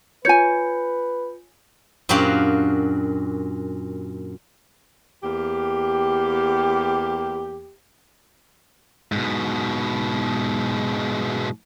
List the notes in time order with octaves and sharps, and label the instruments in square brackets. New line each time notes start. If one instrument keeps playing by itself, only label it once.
[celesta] F4 G6 C#7 [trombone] B4 [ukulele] C#5 G#5
[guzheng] F#2 A#2 D4 F#4 G4 F5
[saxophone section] E2 A#3 G4
[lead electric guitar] G#2 B2